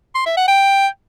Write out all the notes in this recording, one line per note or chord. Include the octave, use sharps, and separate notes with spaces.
C6
E5
F#5
G5